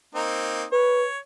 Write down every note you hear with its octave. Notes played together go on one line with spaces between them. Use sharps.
A#3 C4 D#4
B4 C#5